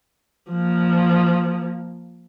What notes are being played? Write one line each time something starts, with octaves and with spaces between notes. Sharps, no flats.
F3 A#3